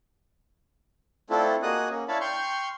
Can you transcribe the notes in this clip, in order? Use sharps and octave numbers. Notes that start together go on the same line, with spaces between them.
A3 C4 D4 E4 F4 A4
A#3 F#4 G#4 D#5 D#6 F#6
A#3 C#4
D4 E4 C#5 F5 A5 B5
G5 C6 C#6 F6 G6